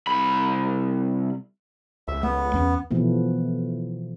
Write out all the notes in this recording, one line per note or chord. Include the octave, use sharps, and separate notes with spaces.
C2 B5
C#2 E5
A3 B3
E2 C#4
B2 E3 F3 A3 B3